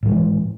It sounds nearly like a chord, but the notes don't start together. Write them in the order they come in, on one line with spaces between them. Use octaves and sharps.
A2 F3 G#3 E3